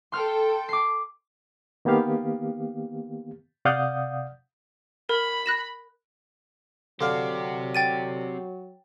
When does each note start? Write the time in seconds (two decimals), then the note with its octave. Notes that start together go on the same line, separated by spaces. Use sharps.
0.12 A4 G5 C6 F6
0.69 D6 C7
1.85 D#3 A#3 B3 G4 F5
3.65 C3 D5 F5 F#5 D#6 G6
5.09 A#4 B5
5.46 F#6 A#6 E7
7.01 D3 F#3 C4 G4 F5
7.75 G5 A6 D#7